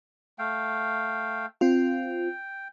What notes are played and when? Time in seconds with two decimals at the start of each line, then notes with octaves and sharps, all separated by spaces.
0.39 A3 F5 G5
1.61 C4 F4 G5